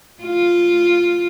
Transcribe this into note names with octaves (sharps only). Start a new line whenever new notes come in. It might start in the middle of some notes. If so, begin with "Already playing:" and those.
F4